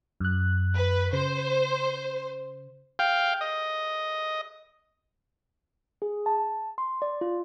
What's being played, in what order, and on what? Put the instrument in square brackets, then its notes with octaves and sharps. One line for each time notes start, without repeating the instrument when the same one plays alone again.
[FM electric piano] F#2 F#6
[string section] B4
[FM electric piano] C#3 [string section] C5
[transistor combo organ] F5 G5
D#5
[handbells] G#4
A5
C6
D5
F4